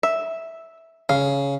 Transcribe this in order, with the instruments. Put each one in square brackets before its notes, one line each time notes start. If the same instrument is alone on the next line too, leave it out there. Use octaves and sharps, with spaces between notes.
[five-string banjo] E5
[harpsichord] C#3 [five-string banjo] F5